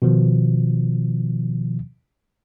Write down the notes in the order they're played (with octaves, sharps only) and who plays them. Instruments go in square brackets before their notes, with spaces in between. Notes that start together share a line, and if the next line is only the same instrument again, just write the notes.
[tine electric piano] B2 D#3 F3